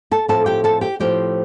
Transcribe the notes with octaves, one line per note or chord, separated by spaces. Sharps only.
A4 A5
A2 F3 A3 C4 A4 A5
G4 G5
A4 A5
G4 G5
A2 F3 A3 C4 G4 G5